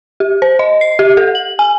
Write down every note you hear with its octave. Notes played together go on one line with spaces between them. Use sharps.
G4
C5
D#5
C7
G4
A4
F#7
G#5